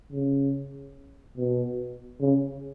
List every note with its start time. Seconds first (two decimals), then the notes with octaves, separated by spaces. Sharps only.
0.13 C#3
1.38 B2
2.21 C#3